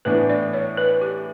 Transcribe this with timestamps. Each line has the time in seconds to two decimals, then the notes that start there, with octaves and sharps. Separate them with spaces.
0.05 A2 E3 B3 D4 B4
0.29 D5
0.53 C#5
0.77 B4
1.01 G4